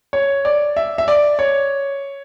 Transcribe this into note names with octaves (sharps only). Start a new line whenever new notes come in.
C#5
D5
E5
E5
D5
C#5